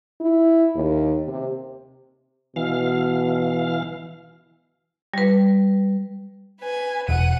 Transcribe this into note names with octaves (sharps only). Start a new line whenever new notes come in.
E4
D#2
C3
B2 E3 F5
G3 B4
B4 G#5
E1 F#5 D#7